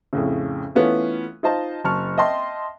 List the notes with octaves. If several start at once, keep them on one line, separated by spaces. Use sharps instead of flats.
F2 A2 C#3
E3 A3 B3 C#4 F4
D#4 F4 C5 D#5 A5
F#1 A5 C#6 F6
D#5 E5 G5 A5 C6